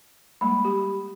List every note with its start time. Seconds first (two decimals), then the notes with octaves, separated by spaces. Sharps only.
0.41 G3 G#3 A#3 B5
0.65 G4